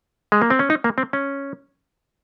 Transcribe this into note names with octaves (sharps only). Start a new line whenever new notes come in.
G#3
A#3
C4
C#4
D#4
A#3
C4
C#4